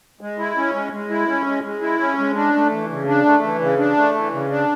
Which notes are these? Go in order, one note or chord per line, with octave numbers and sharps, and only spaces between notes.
G#3
E4
C#4
G#3
G#3
E4
C#4
G#3
G#3
E4
C#4
G#3
D4
A3
E3
C#3
D4
A3
E3
C#3
D4
A3
E3
C#3
D4